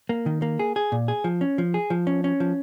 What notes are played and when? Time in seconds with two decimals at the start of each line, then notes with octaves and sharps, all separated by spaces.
0.09 A#3
0.26 D#3
0.42 A#3
0.59 G#4
0.76 G#4
0.92 A#2
1.08 G#4
1.24 F3
1.41 C#4
1.58 F3
1.74 G#4
1.90 F3
2.07 C#4
2.24 C#4
2.40 F3